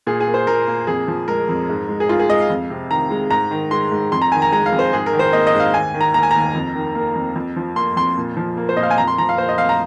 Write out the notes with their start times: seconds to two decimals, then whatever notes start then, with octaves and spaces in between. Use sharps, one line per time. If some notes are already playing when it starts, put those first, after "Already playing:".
0.07 A#2 G#4
0.20 G#4
0.27 A#3
0.34 C5
0.47 A#2 A#4
0.68 A#3
0.87 F2 G#4
1.08 F3
1.28 G#3 A#4
1.49 F2
1.69 G#2
1.89 G#3
2.00 G#4
2.09 G#2 F4
2.19 G#4
2.29 G#3 D#5
2.40 F5
2.50 F2
2.70 C3
2.90 D#3 A#5
3.11 G#3
3.30 G#2 A#5
3.51 D#3
3.71 G#3 C6
3.92 G#2
4.12 F2 C6
4.22 A#5
4.32 D#3 G#5
4.42 A#5
4.52 G#3 A#5
4.66 F5
4.73 F2
4.79 C5
4.93 G#2 G#4
5.06 A#4
5.13 D#3
5.19 C5
5.33 A#3 D#5
5.47 D#5
5.54 G#2
5.60 F5
5.74 D#2 G#5
5.94 D#3
6.01 A#5
6.14 A#3 A#5
6.23 G#5
6.31 D#2 A#5
6.55 F2
6.75 D#3
6.95 A#3
7.15 F2
7.36 F2
7.56 F3
7.76 A#3 C6
7.96 F2 C6
8.17 A#2
8.37 F3
8.57 A#3
8.69 C5
8.77 A#2 D#5
8.83 F5
8.91 G#5
8.98 F2 A#5
9.08 C6
9.18 F3 A#5
9.29 F5
9.38 A#3 C5
9.49 D#5
9.58 F2 F5
9.69 A#5